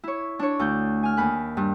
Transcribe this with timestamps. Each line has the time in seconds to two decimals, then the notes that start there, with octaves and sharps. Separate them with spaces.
0.04 E4 C#5
0.39 D4 C#5
0.59 D2 A3 G6
1.03 G#5 F6
1.17 D#2 B5 F#6
1.57 G2